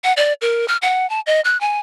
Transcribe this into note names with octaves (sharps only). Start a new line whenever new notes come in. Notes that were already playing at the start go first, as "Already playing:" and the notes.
F#5
D5
A#4
F6
F#5
A5
D#5
F#6
G#5